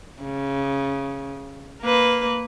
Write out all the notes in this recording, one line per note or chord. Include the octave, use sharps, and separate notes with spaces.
C#3
A#3 B4